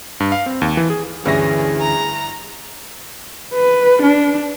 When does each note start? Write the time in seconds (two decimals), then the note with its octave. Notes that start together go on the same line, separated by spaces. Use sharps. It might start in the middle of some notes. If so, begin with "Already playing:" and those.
0.20 G2
0.32 F5
0.46 C4
0.62 D#2
0.77 E3
0.90 G#4
1.25 D2 G2 E3 C#4 E4 G#4 A#6
1.81 A#5
3.53 B4
4.03 D4